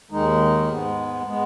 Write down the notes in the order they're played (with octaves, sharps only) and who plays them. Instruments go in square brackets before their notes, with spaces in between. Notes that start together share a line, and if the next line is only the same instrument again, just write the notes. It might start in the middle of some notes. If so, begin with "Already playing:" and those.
[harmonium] D#2 D#3 G#3 D#4
G#2 G#3 B3
G#3 B3